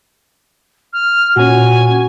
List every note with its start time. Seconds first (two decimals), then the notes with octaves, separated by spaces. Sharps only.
0.93 F6
1.37 A#2 C#4 F#4 G#5